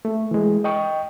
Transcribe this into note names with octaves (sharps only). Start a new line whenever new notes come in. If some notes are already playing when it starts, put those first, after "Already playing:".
A3
E3 G#3
D#5 G5 C#6